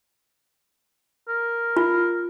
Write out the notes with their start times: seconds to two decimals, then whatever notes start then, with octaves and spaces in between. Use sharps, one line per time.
1.29 A#4
1.77 F4